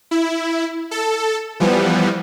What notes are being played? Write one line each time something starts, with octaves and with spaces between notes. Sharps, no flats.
E4
A4
E3 F3 G3 B3